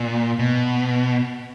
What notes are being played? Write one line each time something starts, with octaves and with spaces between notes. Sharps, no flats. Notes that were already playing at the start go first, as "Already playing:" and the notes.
Already playing: A#2
B2